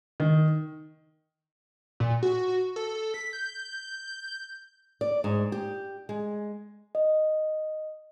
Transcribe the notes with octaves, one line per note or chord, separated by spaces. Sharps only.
D#3
A#2
F#4
A4
B6
G6
D5
G#2
G4
G#3
D#5